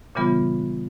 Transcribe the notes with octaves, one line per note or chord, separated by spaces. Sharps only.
A#2 C#3 E3 G3 B3 F4